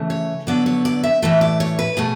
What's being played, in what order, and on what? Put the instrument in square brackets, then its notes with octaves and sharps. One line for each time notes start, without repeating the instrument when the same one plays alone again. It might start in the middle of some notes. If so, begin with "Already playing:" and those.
Already playing: [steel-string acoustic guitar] C#3 E3 A3
C#5
D3 F#3 B3 D5
C#5
D5
E5
A2 E3 A3 E5
D5
C#5
B4
B2 A3 G#4